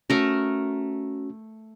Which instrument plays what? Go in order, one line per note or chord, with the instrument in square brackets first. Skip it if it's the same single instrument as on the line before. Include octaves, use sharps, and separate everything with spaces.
[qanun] A3 A#4 [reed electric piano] C#4 F#4